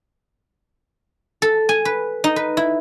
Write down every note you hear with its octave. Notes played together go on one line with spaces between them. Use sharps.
A4
G#5
B4
D#4
B4
E4